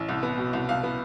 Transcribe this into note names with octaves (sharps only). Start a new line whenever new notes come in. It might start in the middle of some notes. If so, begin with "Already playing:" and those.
Already playing: A1
C2
B3
B2
C2
C2 F5
B3